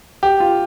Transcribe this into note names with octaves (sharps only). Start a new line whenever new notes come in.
G4
F4